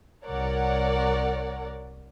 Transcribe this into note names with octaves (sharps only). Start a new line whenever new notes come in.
C2 A#4 C#5 D5 F#5